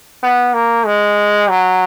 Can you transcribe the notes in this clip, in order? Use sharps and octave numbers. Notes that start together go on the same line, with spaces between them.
B3
A#3
G#3
F#3